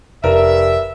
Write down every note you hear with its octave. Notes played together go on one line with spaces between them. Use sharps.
F1 G2 A#4 E5